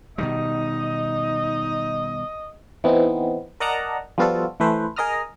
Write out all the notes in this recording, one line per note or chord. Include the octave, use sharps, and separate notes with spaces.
B2 D#3 G3 D#4 D#5
E3 B3 C4 D#4
A#4 D5 D#5 F#5 A5 A#5
F3 G3 B3 F4 F#4 A4
E3 A3 B4 C5
G#4 A#4 D#5 A#5 D#6 F6